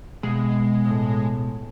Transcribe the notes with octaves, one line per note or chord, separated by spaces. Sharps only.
B2 G#3 G#4
A2